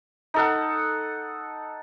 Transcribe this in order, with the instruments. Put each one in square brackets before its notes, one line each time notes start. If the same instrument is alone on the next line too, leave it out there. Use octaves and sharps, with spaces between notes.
[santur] D#4 A4 F#5